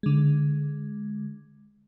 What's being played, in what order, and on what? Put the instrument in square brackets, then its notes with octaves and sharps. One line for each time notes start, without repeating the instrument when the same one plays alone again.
[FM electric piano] D3 G#3